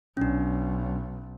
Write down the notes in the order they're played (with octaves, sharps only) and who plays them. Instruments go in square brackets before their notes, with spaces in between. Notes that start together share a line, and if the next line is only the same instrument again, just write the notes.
[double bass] B1 [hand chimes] C#4 D4